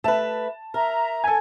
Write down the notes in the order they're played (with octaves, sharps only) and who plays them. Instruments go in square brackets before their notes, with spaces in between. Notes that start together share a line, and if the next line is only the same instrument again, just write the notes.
[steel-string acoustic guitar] A3 B4 [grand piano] A5
[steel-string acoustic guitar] A#4 [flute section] E5 A#5
[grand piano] A4 G#6 [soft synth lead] G#5